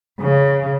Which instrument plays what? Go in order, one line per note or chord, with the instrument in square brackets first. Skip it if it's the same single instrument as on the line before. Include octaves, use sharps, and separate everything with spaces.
[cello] C#3